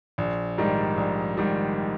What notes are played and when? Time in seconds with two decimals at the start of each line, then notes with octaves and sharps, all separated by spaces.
0.18 A#1
0.58 G#2 D#3 G3
0.97 A#1
1.37 G#2 D#3 G3